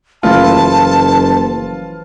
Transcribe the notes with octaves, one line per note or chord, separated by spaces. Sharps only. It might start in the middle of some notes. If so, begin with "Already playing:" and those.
F#1 E3 F3 A3 F4 A5